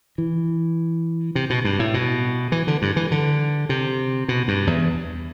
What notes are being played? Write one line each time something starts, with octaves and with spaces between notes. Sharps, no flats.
E3
C3
B2
G2
A2
B2
E3
D3
G2
E3
D3
C3
B2
G2
E2